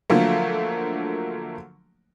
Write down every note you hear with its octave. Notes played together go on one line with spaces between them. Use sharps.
D3 F3 F#3 A3 A#3